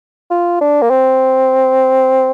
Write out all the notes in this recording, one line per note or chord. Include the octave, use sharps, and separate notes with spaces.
F4
D4
A#3
C4